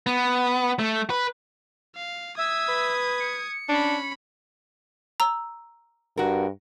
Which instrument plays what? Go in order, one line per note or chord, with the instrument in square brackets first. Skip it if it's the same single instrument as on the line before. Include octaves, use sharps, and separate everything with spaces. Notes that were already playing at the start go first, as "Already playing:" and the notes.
[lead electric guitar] B3
A3
B4
[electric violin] F5
[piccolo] E5 [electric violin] D#6 G#6
[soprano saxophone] B4
[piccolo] C#7
[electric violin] C#4 B5 [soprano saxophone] D4
[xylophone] A#5 E6
[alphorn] G2 [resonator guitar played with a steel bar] F#4 A#4